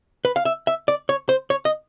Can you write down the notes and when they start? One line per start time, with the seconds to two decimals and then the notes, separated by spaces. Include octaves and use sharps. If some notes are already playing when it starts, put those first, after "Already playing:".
0.25 B4
0.36 F5
0.45 E5
0.67 E5
0.88 D5
1.09 C#5
1.29 C5
1.50 C#5
1.65 D#5